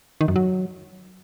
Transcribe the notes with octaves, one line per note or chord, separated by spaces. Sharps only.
D#3
F#2
F#3